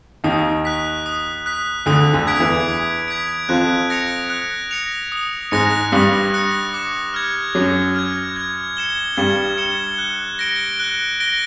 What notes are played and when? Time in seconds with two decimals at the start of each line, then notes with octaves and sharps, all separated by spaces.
0.24 D#2 D#3 D#6
0.65 F#6 B6
1.06 D#6
1.46 F#6 B6
1.86 D2 D3 D#6
2.13 D2 D3
2.27 G#6 B6 D7
2.40 E2 E3
2.68 D#6
3.08 G#6 B6 D7
3.48 F2 F3 F#6
3.90 A#6 C#7 F7
4.30 F#6
4.71 A#6 C#7 F7
5.12 D#6
5.51 G#2 G#3 F#6 A#6 C#7
5.92 G2 G3 D#6
6.34 F#6 A#6 C#7
6.74 D6
7.14 F6 G#6
7.55 F#2 F#3 D6
7.96 F6 G#6
8.36 G#6
8.77 C#7 E7 G7
9.17 G2 G3 G#6
9.58 C#7 E7 G7
9.98 F#6
10.39 A#6 D7 G7
10.80 F#6
11.20 A#6 D7 G7